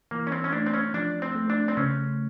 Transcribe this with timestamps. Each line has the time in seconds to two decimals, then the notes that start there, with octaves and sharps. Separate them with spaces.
0.11 E3 A#3
0.27 C#4
0.32 C4
0.44 C#4
0.53 A3 D4
0.66 C4
0.74 C#4
0.94 F3 D4
1.22 C4
1.35 A3
1.50 D4
1.68 C4
1.77 C#3 C#4